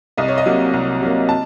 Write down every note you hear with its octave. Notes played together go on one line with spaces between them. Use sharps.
C2 D#5
C#5
D#5
C3 F#3 A#3
C2
C3 F#3 A#3
A5